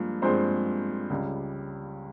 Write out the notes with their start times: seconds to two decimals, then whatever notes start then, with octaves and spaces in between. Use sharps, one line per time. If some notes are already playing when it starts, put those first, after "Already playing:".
Already playing: G2 F3 G#3 A#3
0.22 G2 F3 G#3 C4 C5
1.10 C#2 C#3 G3